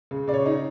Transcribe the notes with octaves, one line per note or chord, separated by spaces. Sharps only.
C#3
C#3 D5
C#5
D#4